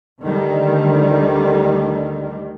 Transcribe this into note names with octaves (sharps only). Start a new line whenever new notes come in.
D2 D3 D#3 G3